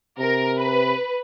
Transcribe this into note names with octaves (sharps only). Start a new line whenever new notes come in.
C3 A#4
B4